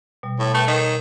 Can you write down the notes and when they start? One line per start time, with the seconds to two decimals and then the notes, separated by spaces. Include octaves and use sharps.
0.23 B2 G3
0.39 A2
0.54 A3 B4 G5
0.68 D#3